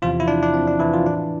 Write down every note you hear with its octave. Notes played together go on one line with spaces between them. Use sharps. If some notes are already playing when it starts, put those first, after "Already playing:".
E2 C3 E3 F3 F4
E4
D4
D4
C4
D4
E3 E4
F3 F4
A2 E3 D4